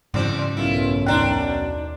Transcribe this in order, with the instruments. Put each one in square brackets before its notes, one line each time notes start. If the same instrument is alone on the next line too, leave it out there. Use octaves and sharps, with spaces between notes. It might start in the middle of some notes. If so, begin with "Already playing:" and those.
[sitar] E2 C4 D5 [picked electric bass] G#2 C#3 F#3
[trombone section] B1 F#2 [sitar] E4 F4
[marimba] D#2 A#5 C6 [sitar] D#3 D4